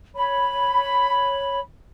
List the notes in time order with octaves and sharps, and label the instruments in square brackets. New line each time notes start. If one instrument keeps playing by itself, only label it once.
[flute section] C#5 B5